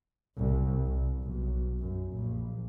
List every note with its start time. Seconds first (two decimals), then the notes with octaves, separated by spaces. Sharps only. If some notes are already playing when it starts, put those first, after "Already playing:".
0.36 C2
0.86 C2
1.23 B1
1.79 F#2
2.12 A#1